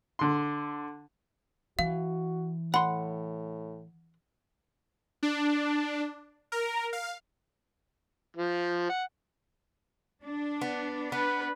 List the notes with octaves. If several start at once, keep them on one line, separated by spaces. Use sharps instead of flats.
D3 C6
E3 F#4 F5
A2 F#5 B5 C6
D4
A#4
F5
F3
F#5
D4
B3
B3 B4